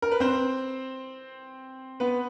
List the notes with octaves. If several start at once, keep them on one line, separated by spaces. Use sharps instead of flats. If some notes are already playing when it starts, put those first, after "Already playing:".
A#4
B4
C4 C5
B3 B4